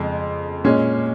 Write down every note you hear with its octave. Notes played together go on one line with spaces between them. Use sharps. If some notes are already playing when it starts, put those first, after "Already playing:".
Already playing: F2 C#3 G#3
A#2 G#3 C#4